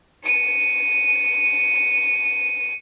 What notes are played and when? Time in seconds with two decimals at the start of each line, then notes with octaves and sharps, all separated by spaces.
0.23 C#7 D#7